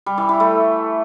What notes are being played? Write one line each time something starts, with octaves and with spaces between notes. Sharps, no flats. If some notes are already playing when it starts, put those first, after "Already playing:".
G3
E3
E3
A3